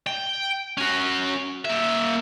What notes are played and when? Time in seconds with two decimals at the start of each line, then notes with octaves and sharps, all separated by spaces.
0.07 G5
0.78 C#4 F#4
1.65 A#3 E5